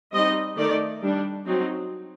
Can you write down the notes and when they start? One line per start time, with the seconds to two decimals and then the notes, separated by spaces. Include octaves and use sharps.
0.13 G3 C4 D#4 D#5
0.57 D#3 A3 D#4 D5
1.02 G3 D4
1.46 F#3 C4 D#4